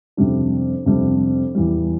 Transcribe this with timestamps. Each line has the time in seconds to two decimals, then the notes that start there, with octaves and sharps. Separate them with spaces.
0.17 F2 C3 G3 D4
0.86 F2 C3 G3 D4
1.55 E2 E3 G3